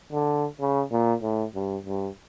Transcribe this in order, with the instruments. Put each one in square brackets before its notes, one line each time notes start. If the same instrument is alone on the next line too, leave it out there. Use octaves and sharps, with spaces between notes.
[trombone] D3
C#3
A#2
A2
G2
G2